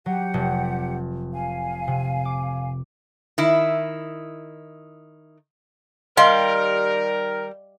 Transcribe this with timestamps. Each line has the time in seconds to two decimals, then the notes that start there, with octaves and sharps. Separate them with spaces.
0.06 F#3 G4 F#5
0.34 F1
1.32 F5 G#5
1.87 C3
2.25 D6
3.38 D#3 E4
6.17 D#3 G3 G4 A#4 D#5 F5 C6